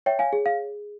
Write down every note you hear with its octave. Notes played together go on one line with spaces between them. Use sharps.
C#5 E5 G5
F5 G#5
G#4
F5